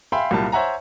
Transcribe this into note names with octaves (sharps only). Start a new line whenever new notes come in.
E5 F5 G5 G#5 B5 C6
C2 A#2 F#3 G3 A5
C5 C#5 E5 F#5 G#5 A#5